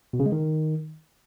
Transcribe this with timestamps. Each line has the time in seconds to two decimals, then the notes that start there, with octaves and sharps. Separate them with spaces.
0.13 B2
0.20 C#3
0.26 G#3
0.32 D#3